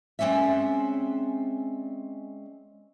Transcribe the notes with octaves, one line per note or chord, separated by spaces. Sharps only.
G#3 C4 C#4 D5 E5